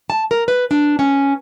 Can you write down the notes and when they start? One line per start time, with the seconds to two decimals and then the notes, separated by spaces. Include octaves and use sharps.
0.10 A5
0.31 A#4
0.48 B4
0.71 D4
0.99 C#4